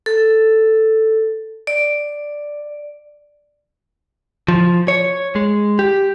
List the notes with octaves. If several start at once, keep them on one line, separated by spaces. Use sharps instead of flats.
A4
D5
F3
C#5
G#3
G4